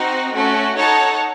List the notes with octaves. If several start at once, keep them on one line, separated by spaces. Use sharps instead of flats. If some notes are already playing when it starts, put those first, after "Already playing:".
Already playing: C4 D#4 F#4
A3 C#4 F#4
D#4 A4 C#5 F#5 A5